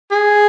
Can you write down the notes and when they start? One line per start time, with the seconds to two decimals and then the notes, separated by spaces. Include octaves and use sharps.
0.11 G#4